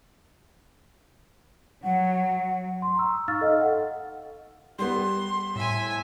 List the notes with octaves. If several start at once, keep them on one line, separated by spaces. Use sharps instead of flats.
F#3 F#5
C6
A#5 C#6 E6
D#6
D#4 F5 C#6 E6 F6 A6
A4 D#5 F5 G#5
F#5
G3 B3 C6
A2 E5 G#5